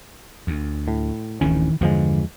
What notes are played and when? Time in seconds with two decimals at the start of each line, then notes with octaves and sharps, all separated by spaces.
0.47 D2
0.88 A2
1.41 D1 A1 D#3 E3 C#4
1.81 E2 G2 D3 F3 G#3